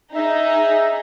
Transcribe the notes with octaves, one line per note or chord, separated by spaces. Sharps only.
D#4 G#4 E5